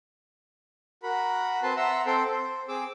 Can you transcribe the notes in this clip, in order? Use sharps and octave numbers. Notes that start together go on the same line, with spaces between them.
F#4 A#4 B5
C4 B4 A5 C6
E5 F#5 A#5 C6 E6
C4 A4 G5 C6
C5
C4 G#4 D6 E6